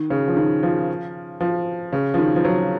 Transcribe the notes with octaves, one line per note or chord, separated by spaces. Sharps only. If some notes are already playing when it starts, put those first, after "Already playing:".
Already playing: D#3
C#3
F3
D#3
F3
F3
C#3
F3
D#3
F3
F#3